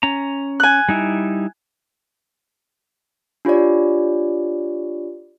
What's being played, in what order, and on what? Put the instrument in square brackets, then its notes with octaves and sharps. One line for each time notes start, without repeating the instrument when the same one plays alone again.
[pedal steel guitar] C#4 A#5
[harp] G#5 F#6
[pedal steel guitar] G3 D#4 E4
[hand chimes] D4 F4 G4 C#5 D5